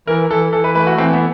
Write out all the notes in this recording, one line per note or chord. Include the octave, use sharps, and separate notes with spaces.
E3 A#4
E3 A4
E3 A4
B4
A3 B4
F#4
E3 C4
B3